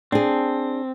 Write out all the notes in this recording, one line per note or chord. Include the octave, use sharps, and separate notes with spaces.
C4 D4 G#4